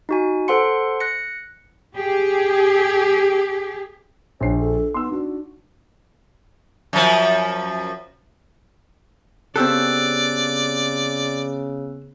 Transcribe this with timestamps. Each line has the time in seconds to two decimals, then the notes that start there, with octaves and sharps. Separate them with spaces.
0.09 D#4 F#4 G#5
0.48 A4 C5 F#5 C6 C#7
1.00 F#6 A#6 C#7
1.96 G4 G#4
4.41 A#1 D4 C5 C#5 C7
4.60 A4
4.94 B3 D#4 C6 E6
5.12 D4 F#4
6.93 F#2 F3
9.56 C#3 B3 C4 G4 A4 D5 E6 F#6